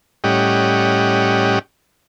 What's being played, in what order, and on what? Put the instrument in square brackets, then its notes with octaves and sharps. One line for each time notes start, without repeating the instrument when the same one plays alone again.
[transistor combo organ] A2 G3 C#4 G4 D#5 F#5